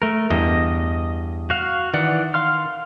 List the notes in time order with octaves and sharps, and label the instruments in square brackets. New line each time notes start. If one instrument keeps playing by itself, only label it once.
[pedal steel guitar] A3 A#4
[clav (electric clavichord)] E2 G2 [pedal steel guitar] D#5
[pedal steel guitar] F#4 F5
[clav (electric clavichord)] D#3 [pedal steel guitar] E3 D5 F#5
[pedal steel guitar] F5 C6 F6